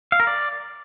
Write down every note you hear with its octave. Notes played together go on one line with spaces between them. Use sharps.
F5
A#4
D5